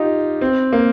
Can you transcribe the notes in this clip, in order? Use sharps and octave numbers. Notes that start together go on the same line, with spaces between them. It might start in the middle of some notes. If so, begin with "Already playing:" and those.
Already playing: D#4 F4 G4
C4
A#3